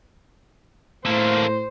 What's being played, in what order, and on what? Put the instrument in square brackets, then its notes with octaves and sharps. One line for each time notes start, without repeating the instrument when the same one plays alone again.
[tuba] A2 [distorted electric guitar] A3 A#3 [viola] C5